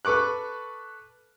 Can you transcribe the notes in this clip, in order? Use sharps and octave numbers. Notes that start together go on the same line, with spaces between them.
A4 B4 C#6 D6 F#6